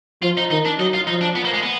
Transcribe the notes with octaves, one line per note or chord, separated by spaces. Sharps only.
F3 F4
D#4
D#3 D#4
D4
F#3 D#4
F4
F3 D#4
D4
B3
A#3
G#3
B3